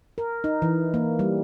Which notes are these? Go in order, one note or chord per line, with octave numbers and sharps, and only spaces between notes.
A#4
D#4
E3
A#3
G3